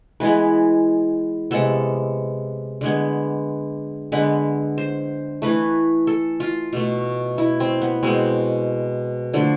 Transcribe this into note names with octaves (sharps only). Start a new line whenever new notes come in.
E3 G#3 B3 B4
C3 G#3 B3 A4
D3 G#3 B3
D3 G#3 B3 B4
C5
E3 A3 B4
A4
F4
B2 A3
E4
C4
B3
B2 G#3 B3 C4
D3 F3 A3